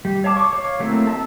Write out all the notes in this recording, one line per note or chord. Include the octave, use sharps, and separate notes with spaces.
G3
C#5 F5 A5 D6
C#6 D6
C#5 F5
F#3 A3 A#3 C4 E4
A4 E5 A5